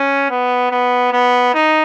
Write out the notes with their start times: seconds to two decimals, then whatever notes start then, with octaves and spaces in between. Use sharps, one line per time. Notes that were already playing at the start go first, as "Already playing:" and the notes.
Already playing: C#4
0.30 B3
0.71 B3
1.13 B3
1.54 D#4